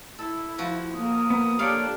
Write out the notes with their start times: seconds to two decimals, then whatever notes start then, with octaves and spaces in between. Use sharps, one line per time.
0.19 E4 A4
0.58 F3 F#4
0.96 A#3 A#4 D#6
1.30 B3
1.59 A#3 D4 G4 A4 C#5 D5 F5